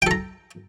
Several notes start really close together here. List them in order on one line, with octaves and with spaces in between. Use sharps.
G5 A4 A#5